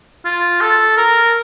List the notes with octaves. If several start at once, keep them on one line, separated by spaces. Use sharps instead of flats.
F4
A4
A#4